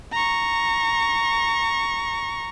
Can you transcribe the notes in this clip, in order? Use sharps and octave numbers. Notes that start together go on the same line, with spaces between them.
A#5 C#6